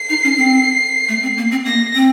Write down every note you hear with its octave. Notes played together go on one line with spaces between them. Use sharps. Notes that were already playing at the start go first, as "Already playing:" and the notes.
Already playing: C7
D#4
C#4
C4
A3
C4
A#3
C4
A#3 A#6
C4